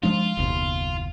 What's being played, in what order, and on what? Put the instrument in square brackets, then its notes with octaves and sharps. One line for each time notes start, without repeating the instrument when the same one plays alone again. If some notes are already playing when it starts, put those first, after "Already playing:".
[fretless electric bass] F3 G#3 D4 [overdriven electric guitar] F4
[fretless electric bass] F#1 D#2 B2